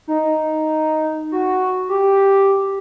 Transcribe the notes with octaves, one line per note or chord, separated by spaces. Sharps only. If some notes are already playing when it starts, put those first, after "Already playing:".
D#4
F#4
G4